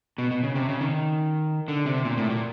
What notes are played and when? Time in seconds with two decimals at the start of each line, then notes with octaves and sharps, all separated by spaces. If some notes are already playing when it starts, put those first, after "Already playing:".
0.18 B2
0.31 B2
0.43 C#3
0.55 C3
0.69 C#3
0.81 D#3
1.68 D3
1.86 C3
2.05 A#2
2.17 A2
2.30 A#2